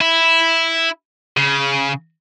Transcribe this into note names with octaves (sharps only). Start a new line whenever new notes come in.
E4
C#3